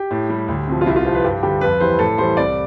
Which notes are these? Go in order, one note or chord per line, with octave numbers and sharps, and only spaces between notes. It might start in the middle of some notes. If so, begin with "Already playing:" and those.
Already playing: G4
A2
G3
D2
C3 F3
F4
C2 E4
F4
C3 F3 C5
B4
G2 G4
D3 G3 G4
F2 B4
E3 G3 C5
A2 A4
E3 G3 C5
C2 D5